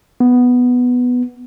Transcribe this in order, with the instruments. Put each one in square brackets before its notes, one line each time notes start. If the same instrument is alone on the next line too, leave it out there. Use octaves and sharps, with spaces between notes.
[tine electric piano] B3